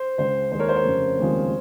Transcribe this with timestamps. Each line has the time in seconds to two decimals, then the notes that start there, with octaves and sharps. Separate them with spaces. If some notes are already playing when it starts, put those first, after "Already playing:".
Already playing: C5
0.18 C#2 C#3 G#3 C5
0.52 D#2 D#3 G#3 C5
0.59 A#4 C#5
0.69 C5
0.76 A#4 C#5
0.84 F1 F2 C#3
1.18 F1 D#2 C#3 F3 G#3